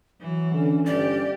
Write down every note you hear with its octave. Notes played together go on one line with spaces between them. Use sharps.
E3 F#3
D3 C#4
G1 G4 D5